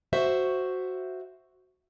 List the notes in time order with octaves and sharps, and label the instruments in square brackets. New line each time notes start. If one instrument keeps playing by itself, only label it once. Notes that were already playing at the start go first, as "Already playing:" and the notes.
[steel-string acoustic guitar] F#4 C5 E5